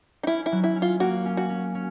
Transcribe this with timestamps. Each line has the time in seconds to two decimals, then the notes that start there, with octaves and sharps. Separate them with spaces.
0.23 D#4
0.27 C#4 E4
0.46 E4
0.52 F#3
0.64 E4
0.76 C#4
0.82 F4
1.00 A#3 F#4
1.26 C#4
1.37 F#4
1.49 C#4
1.75 C#4